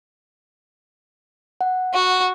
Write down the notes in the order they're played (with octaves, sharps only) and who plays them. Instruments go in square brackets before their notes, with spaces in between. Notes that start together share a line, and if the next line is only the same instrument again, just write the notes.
[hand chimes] F#5
[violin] F#4